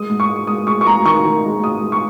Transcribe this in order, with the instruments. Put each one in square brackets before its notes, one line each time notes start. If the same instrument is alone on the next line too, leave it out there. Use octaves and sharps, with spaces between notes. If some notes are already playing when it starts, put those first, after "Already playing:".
Already playing: [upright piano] G#3 D#6
G#2
C#6
G#3
G#3 D#6
G#3 C#6
C#6
G#2 A#5
D#3 C#6
D#3
G#3
G#2 D#6
G#3
C#6